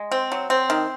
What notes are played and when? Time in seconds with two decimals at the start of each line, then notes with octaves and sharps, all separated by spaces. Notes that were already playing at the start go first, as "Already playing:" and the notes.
Already playing: G#3
0.12 C4
0.32 F#3
0.50 C4
0.70 D#3